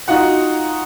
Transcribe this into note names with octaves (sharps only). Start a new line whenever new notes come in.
D#4 F4 F#4 F#5